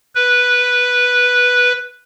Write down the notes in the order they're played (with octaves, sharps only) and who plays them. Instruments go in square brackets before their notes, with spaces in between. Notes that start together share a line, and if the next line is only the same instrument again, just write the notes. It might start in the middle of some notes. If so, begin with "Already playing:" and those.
[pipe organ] B4